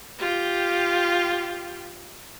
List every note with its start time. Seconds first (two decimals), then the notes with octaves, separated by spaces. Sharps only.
0.19 F4 G4